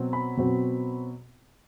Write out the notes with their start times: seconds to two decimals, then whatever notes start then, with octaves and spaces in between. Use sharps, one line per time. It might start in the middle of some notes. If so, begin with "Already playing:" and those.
Already playing: B2 F#3 C4
0.13 B5
0.37 B2 F#3 C4